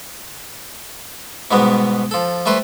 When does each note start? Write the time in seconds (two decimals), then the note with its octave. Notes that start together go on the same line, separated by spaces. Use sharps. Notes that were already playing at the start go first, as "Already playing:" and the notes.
1.51 G#2 B2 G3 B3
2.11 F3 A4
2.46 G3 A3 B4 C5